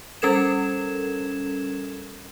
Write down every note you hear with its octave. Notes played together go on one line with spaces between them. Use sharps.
G3 C#4 A4 A#4 G#6 E7